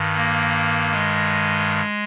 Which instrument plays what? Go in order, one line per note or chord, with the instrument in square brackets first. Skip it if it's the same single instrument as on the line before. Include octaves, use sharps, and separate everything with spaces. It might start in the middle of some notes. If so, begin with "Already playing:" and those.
Already playing: [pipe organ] G2 D#3
A#3
G#3